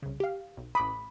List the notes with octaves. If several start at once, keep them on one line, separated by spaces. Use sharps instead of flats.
C2 C#3
G4 F5
B1
A1 B5 D6 D#6